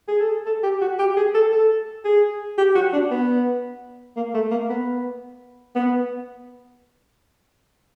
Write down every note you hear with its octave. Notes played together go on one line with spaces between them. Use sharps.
G#4
A4
A4
G4
F#4
G4
G#4
A4
A4
G#4
G4
F#4
D4
B3
A#3
A3
A#3
B3
B3